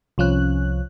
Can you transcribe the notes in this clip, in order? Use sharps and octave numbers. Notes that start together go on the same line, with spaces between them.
C2 F3 C#4 F#6